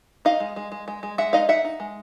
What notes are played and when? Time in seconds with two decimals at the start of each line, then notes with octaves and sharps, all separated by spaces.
0.25 D#4 D#5 F5
0.40 G#3
0.56 G#3
0.72 G#3
0.88 G#3
1.03 G#3
1.18 G#3 E5 F#5
1.33 D#4 D#5 F5
1.49 D#4 E5 F#5
1.65 D#4
1.80 G#3